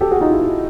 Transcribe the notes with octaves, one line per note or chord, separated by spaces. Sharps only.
G4 A4
F#4 G#4
D#4 F4
E4
E4